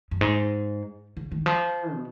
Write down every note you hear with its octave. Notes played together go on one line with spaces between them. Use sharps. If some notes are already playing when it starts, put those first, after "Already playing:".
F#2
G#2
C#3
D#3
F3
B2